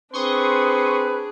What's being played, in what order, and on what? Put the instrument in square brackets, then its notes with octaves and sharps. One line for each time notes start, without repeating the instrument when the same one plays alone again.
[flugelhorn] C4 [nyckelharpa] D4 G#4 [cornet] B4 [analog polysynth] C6 C#6 D#6